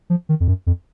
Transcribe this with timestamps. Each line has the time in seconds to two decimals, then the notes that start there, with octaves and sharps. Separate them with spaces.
0.10 F3
0.29 D#3
0.40 F2
0.48 F#2
0.67 F2